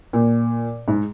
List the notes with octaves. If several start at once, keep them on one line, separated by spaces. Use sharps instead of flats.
A#2
G#2